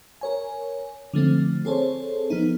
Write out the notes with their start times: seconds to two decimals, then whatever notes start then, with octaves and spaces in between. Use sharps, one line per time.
0.21 A#4 C#5 G#5
1.14 D3 F3 A3 C4
1.65 C4 G#4 A4 C5 C#5
2.30 F3 B3 D#4